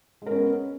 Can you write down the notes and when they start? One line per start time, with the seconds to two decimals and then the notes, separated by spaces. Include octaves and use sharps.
0.22 G#3
0.26 A#4
0.31 C#4
0.36 B3